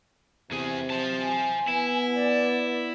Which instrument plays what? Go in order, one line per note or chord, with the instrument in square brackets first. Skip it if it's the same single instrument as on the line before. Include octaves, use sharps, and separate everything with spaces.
[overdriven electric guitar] E2 G#4 [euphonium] C3
[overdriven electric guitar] C5 A5
[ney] G#5
[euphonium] B3 [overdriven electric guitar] E4
[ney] D5